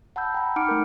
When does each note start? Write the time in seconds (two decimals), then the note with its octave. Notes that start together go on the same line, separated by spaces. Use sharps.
0.16 F#5 A5 B5 E6 G6
0.34 G5 A#5 B5
0.56 D#4 F#5 D6 F6 C#7 D7
0.69 A3 A#4